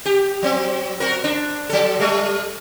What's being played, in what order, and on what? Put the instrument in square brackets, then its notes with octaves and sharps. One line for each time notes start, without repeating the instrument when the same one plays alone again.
[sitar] G4
F#3 C4
C4 F#4 A#4
D4
F#3 A4
G3 A3